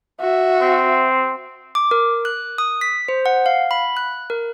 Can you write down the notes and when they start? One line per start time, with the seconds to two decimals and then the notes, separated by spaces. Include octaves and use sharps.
0.20 F#4 E5
0.61 C4
1.75 D6
1.91 A#4
2.25 F#6
2.58 D#6
2.81 B6
3.08 C5
3.26 F#5
3.46 F5
3.71 B5
3.97 F#6
4.30 A#4